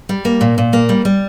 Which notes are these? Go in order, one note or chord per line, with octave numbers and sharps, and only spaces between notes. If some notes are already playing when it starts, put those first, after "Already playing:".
G3
A#3
A#2
A#2
A#3
G3
G3